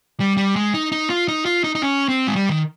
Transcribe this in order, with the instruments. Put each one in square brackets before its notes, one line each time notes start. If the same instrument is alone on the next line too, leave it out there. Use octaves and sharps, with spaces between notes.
[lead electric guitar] G3
G3
G#3
D#4
D#4
F4
D#4
F4
D#4
D#4
C#4
C4
G#3
G3
D#3